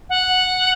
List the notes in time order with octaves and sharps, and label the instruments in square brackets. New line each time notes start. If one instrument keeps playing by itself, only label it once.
[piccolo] F#5